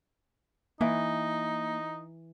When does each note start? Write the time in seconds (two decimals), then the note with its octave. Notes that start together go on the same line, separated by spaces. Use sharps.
0.81 E3 A#3 D#4